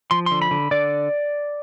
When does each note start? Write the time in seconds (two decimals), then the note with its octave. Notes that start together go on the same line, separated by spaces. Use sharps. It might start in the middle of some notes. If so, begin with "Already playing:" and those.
0.11 F3 C6
0.26 D3 C6
0.42 B5
0.51 D3
0.71 D3 D5